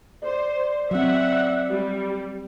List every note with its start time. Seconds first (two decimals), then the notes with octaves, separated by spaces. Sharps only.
0.24 C5 D5
0.91 F#3 C4 E5 F#5
1.70 G3